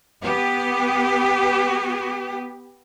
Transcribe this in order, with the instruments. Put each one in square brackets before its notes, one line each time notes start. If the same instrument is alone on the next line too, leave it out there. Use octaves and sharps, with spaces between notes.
[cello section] B3 G4